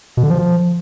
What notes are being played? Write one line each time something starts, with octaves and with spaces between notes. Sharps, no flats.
B2
D3
F3